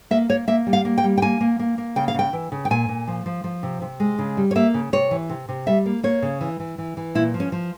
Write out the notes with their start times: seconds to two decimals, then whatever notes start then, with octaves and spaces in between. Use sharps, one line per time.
0.11 A#3 E5
0.29 A#3 C#5
0.48 A#3 E5
0.67 G3
0.73 F5
0.85 A#3
0.98 G5
1.04 G3
1.18 G5
1.22 A#3 G#5
1.41 A#3
1.59 A#3
1.78 A#3
1.96 C#3 G5
2.08 F5
2.14 C#3 G5
2.33 E3
2.52 C#3
2.65 G5
2.70 A#2 G#5
2.89 A#2
3.08 F3
3.26 F3
3.44 F3
3.63 C3
3.82 C3
4.00 G#3
4.19 C#3
4.37 G3
4.51 C#5
4.55 A#3 E5
4.74 C#3
4.93 C3 C#5
5.11 E3
5.29 C3
5.49 C3
5.66 G3 E5
5.86 A#3
6.03 A#3 C#5
6.22 C#3
6.41 E3
6.60 E3
6.78 E3
6.97 E3
7.15 A#2 E4
7.34 F3
7.40 C#4
7.52 F3